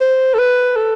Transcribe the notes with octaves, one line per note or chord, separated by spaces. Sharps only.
C5
A4
B4
A4